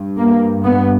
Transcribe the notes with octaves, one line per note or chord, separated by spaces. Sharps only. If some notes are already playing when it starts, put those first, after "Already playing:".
Already playing: G2
A#3
B3